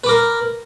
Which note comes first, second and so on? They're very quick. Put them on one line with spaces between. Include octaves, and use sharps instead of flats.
B4 D6 A#4